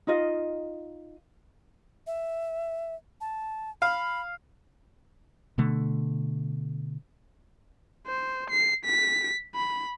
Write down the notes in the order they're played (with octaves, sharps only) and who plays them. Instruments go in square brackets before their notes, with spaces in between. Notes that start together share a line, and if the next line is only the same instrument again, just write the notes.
[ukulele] D#4 F4 D#5 F5
[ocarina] E5
A5
[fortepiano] F5 [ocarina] B5
[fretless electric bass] B2 D3 A3
[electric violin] C5
C7
B6
B5